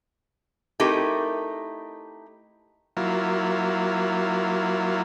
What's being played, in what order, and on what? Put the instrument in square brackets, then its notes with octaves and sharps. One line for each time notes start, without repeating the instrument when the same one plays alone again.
[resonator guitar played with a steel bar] A3 C4 D#4 E4 G4 A#4
[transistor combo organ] F#3 A#3 E4 F4